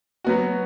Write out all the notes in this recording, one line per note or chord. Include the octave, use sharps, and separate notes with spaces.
F#3 B3 F#4